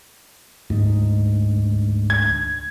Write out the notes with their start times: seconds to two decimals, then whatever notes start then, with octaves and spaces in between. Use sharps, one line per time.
0.70 D2 G#2
2.10 G#6